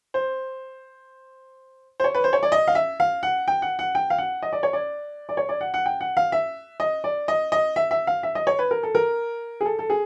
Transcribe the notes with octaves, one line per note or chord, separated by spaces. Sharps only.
C5
C5
C#5
B4
C5
C#5
D5
D#5
F5
E5
F5
F#5
G5
F#5
F#5
G5
F5
F#5
D#5
D5
C#5
D5
D5
C#5
D5
F#5
F#5
G5
F#5
F5
E5
D#5
D5
D#5
D#5
E5
E5
F5
E5
D#5
C#5
B4
A#4
A4
A#4
G#4
A4
A4
G#4